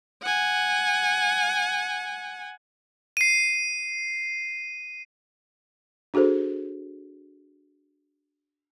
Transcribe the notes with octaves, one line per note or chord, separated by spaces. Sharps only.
F#5 G#5
C7 D#7
D4 F#4 G#4 A4 C5